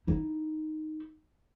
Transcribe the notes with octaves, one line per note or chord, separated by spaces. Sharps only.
D#4 E4